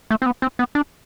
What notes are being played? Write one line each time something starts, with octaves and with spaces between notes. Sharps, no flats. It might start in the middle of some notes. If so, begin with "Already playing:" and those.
A3
C4
B3
C4
B3
D4